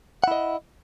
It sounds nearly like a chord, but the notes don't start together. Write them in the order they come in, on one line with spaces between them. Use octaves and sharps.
F#5 E4 D#5